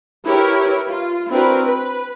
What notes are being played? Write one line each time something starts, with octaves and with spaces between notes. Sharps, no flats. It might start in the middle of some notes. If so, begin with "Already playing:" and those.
E4 G4 A#4 B4 C#5
F4
C4 D4 E4 F#4 A#4 B4
B4